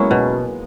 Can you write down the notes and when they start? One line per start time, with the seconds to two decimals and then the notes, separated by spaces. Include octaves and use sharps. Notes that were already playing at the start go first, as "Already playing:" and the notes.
Already playing: F#3 G#3 A#3 B3 C#4 E4
0.11 B2